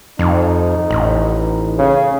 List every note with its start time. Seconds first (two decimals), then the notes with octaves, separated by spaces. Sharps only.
0.19 F2 D#4
0.91 A1
1.78 C#3